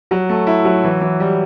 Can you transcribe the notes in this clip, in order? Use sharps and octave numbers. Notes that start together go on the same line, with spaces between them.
F#3
A3
E4
F#3
E3
E3
G3